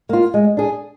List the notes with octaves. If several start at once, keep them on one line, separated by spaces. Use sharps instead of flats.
A#3 F4
G#3
D4 G#4